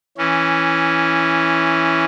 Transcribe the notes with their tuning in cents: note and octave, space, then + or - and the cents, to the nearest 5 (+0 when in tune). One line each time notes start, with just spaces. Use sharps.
E3 +0 C#4 -5